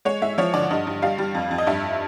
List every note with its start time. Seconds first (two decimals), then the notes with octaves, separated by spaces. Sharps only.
0.05 G#3 C#5
0.22 G#3 E5
0.38 F3 C#5
0.54 D3 D5
0.70 G2 D#5
0.87 G2
1.02 G3 F5
1.18 G3
1.35 F2
1.51 F2
1.58 D#5
1.67 G2 E5